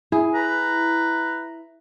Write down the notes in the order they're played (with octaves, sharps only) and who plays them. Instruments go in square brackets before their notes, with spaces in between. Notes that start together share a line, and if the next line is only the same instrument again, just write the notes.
[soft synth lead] E4 [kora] G#4
[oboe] B4 [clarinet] A#5